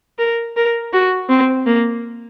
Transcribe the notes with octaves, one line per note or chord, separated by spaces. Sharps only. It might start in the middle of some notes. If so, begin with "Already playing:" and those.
A#4
A#4
F#4
C4
A#3